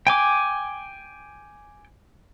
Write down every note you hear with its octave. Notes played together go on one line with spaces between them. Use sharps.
G5 G#5 D6